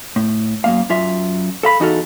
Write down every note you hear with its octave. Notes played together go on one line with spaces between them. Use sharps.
A2
F#2 A#3 F5
F#2 F4 E5
A4 F5 B5
E2 D#4 F#4 A4 F5